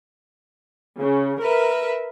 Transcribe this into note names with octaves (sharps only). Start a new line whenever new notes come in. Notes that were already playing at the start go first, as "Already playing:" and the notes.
C#3
A#4 B4 E5